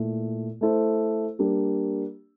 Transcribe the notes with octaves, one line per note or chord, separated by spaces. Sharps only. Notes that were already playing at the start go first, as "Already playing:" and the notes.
Already playing: A#2 A3 E4
A3 E4 A4 C5
G3 A#3 D4 G4